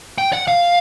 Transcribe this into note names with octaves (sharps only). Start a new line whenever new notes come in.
G5
F#5
F5